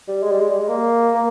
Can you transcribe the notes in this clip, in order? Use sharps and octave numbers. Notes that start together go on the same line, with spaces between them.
G3
G#3
G3
G#3
G3
G#3
A#3
A#3